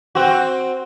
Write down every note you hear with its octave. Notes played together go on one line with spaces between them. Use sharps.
C4 F#4